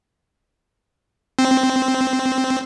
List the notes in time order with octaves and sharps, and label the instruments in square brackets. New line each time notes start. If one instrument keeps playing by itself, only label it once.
[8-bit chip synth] C4